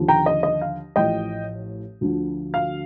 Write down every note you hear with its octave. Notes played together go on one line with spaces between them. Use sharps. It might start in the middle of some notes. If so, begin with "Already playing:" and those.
Already playing: D#2 D3 F3
G5 A#5
D#5
D#5
F5
A1 A2 F3 D#5 G5
D2 D3 F3
F5